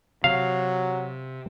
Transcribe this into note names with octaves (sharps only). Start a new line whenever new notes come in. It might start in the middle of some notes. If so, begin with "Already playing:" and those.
C3 F#3 F5